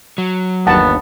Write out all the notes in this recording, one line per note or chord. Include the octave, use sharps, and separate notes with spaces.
F#3
G1 D#2 B3 F#5 A5